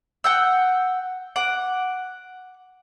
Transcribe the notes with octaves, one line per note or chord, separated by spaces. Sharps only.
F#5 G5 E6
F#5 D6